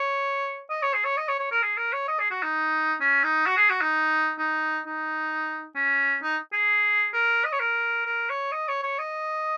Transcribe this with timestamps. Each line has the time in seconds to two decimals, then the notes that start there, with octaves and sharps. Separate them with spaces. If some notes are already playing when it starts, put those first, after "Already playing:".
Already playing: C#5
0.70 D#5
0.82 C#5
0.94 G#4
1.05 C#5
1.17 D#5
1.28 C#5
1.39 C#5
1.51 A#4
1.63 G#4
1.77 A#4
1.93 C#5
2.08 D#5
2.20 G#4
2.31 F#4
2.43 D#4
3.01 C#4
3.24 D#4
3.46 F#4
3.57 G#4
3.70 F#4
3.81 D#4
4.39 D#4
4.85 D#4
5.76 C#4
6.23 D#4
6.53 G#4
7.14 A#4
7.45 D#5
7.52 C#5
7.60 A#4
8.06 A#4
8.30 C#5
8.52 D#5
8.68 C#5
8.83 C#5
8.98 D#5